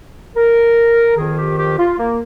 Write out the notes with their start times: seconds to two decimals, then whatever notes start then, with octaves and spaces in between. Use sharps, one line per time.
0.35 A#4
1.17 F2 D#3 G#4
1.37 G4
1.57 G4
1.78 F4
1.98 A#3